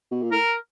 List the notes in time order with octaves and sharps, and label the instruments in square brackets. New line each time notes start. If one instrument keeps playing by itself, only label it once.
[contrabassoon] B2
A#2
[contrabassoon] A2 [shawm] A#4